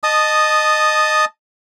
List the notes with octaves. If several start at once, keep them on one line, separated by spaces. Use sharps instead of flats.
D#5 A5 D#6